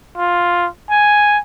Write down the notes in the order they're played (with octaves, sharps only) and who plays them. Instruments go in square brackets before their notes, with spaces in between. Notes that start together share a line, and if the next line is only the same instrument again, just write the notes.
[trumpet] F4
G#5